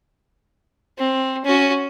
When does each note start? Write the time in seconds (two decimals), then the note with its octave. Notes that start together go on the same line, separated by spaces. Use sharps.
0.99 C4
1.44 C#4 F#4